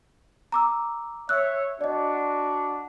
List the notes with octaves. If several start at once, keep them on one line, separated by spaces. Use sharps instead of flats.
A#5 D6 E6
C#5 E5 E6 F#6
D4 F#4 D5 D#5